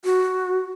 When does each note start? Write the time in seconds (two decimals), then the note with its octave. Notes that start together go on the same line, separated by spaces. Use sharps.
0.04 F#4